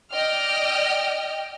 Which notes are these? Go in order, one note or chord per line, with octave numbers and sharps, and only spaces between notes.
D5 D#5 G5 F6